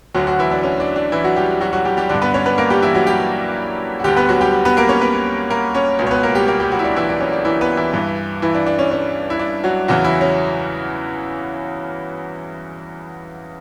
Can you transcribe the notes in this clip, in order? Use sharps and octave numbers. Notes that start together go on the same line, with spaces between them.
D2 D3 F#3 F#4
F#3 F#4
E3 E4
D4
C#4
D4
D4
E3 E4
F#3 F#4
G3 G4
F#3 F#4
F#3 F#4
G3 G4
G3 G4
G2 D3 D4
B3 B4
C#4 C#5
B3 B4
A#3 A#4
G3 G4
E3 E4
F#3 F#4
G3 G4
F#4
D2 D3 G3 G4
B3 B4
F#3 F#4
G3 G4
B3 B4
A#3 A#4
C#4 C#5
B3 B4
A#3 A#4
C#4 C#5
C#2 B2
C#5
B3 B4
A#3 A#4
G3 G4
A#3 A#4
G3 G4
F#3 F#4
E4
D4
E3 E4
D4
C#4
D4
E3 E4
B3 B4
E3 E4
G2 E3
E3 E4
D4
D4
C#4
C#4
E4
D4
F#3 F#4
E2 C#3 E3 F#3 F#4
E3 E4
C#4